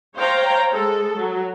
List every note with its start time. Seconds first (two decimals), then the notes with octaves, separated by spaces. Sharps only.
0.17 C5 C#5 F5 G5 A#5
0.73 G#3 A4
1.17 F#3